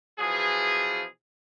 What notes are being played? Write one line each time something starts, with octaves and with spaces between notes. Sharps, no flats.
B2 E3 F3 G#4